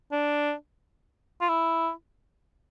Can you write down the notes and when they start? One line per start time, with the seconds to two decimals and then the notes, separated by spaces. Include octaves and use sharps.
0.12 D4
1.41 F4
1.49 E4